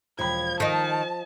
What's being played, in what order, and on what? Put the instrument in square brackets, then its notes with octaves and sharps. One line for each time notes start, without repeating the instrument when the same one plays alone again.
[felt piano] E1 G5 B5 [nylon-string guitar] F3 [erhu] G#6
[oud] D#3 D#4 [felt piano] D#5 D#6 [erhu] A5